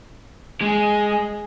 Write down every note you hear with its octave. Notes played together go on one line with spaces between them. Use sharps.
G#3 G#4